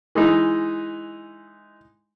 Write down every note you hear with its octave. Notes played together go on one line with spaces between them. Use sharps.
E3 G#3 D#4